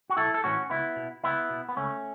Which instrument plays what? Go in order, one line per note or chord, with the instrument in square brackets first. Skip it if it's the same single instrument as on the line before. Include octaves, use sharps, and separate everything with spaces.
[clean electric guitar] F#4
B1 E4 A4
A4
A2 E3 C#4 F#4
C#2 B3 E4
B2
C#2 B3 E4
B2
B3
C#2 A3 C#4